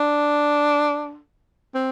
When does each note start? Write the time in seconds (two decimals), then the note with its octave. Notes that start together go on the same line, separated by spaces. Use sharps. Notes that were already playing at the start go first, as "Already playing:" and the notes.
Already playing: D4
1.75 C4